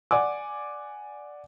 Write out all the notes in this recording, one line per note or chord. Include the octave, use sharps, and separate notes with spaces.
D5 F#5 G#5 D6